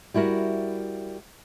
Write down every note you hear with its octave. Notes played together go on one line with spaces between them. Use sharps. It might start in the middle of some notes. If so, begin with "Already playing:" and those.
G3 E4 F#4 A#4